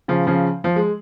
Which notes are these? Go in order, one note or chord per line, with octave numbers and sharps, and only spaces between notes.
C#3 F3
C#3 F3
F3
G#3